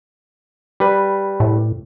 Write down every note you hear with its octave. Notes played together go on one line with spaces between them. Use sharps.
G3 B4
A2